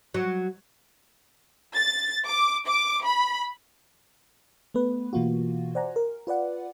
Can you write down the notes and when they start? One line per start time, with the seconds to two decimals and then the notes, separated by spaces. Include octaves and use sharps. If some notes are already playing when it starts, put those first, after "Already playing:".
0.14 F#3
1.75 A6
2.27 D6
2.67 D6
3.06 B5
4.74 A3 B3 B4
5.13 B2 E3 A#3 F4 F#4
5.75 C5 D5 F#5 G#5 A#5
5.96 A#4
6.27 F4 B4 D5 F#5